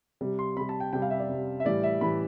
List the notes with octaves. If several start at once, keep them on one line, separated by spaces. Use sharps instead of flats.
C3 G3
C6
C3 G3 B5
A5
G5
C3 G3 G5
F5
E5
D5
C3 G3
E5
A2 E3 G3 D5
E5
A2 E3 G3 B5